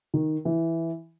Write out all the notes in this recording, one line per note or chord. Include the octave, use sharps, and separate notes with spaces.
D#3
E3